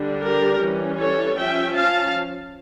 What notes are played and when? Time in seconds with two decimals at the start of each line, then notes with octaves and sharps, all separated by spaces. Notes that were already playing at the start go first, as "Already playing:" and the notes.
Already playing: D3 G3 D4
0.22 G4 A#4
0.61 E3 G3 C#4
0.99 A4 C#5
1.37 F3 C#4 E5 G5
1.76 F5 A5